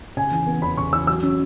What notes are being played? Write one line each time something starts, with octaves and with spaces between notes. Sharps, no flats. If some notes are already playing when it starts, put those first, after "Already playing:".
C#3 G#5
E3
B3
E2 B5
C#3 C#6
E3 E6
F#3 E6
C#4